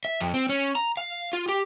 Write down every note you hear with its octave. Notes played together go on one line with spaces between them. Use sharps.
E5
F2
C4
C#4
A#5
F5
F4
G4